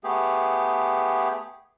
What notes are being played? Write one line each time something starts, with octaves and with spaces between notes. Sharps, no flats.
A3 B3 G4 G#4